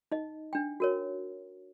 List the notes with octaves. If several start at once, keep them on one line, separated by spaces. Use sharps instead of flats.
D#4 D#5
D4 G5
F#4 A#4 C#5